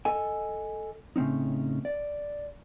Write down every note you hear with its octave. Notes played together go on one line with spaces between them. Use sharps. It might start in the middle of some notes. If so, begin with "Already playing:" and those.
A4 D#5 G#5
A2 C#3 C4 C#4 D#4
D5